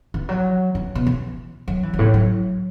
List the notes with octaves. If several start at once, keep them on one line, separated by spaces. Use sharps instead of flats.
E3
F#3
E3
B2
E3
F#3
E3
F#2
A2
F#3